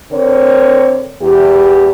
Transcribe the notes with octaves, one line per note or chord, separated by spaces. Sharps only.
D3 C4 A#4 C#5
E2 G4